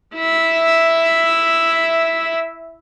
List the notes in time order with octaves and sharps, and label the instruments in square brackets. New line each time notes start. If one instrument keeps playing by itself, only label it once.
[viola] E4 E5